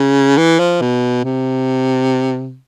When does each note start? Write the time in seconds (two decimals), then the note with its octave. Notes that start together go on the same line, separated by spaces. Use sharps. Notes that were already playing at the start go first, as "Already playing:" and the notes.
Already playing: C#3
0.37 E3
0.59 F3
0.81 B2
1.24 C3